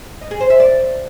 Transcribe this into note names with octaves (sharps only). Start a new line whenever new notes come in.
D#5
G#4
C5
E5
D5